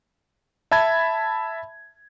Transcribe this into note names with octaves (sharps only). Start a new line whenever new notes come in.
E5 A5 B5 G#6